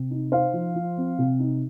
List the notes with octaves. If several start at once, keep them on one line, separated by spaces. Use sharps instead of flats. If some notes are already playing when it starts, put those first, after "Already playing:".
Already playing: C3
D#4
D#4 C5 F5
F3
F3
C4
C3
D#4